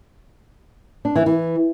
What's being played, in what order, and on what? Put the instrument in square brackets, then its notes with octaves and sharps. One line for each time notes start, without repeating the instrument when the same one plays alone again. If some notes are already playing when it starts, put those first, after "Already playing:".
[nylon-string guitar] D4
E3
E3